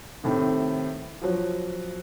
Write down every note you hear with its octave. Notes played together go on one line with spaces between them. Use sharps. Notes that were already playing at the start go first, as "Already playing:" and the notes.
A2 C3 D#3
F3 F#3